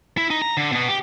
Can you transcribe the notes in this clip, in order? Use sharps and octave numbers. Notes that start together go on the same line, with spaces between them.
E4
D#4
A#5
D3
B2 B3
G4